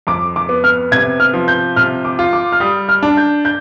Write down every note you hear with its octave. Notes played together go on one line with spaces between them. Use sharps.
F2 D6
D6
B3
F6
C3 G#6
F6
F3
G6
C3 F6
D6
F4
D6
F6
G3 D#6
F6
D4
G6
G6